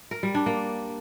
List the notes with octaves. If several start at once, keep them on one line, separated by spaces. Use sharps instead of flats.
A#4
G3
D4
A#3